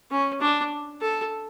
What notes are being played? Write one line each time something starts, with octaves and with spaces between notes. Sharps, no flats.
C#4
D4
A4